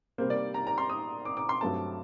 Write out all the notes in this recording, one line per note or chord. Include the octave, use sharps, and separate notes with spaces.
C3 G3 A#3 C5
D5
A#5
A#5
C6
D#6
D6
D6
C6
G2 F#3 A3 C4 A5